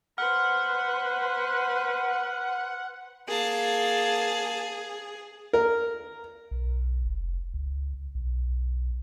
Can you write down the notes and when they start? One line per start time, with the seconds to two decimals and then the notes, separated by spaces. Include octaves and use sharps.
0.18 B4 C5 F#5 F6
3.28 A#3 G#4 A5
5.53 A#4
6.51 B1
7.05 F1
7.54 C#2
8.15 B1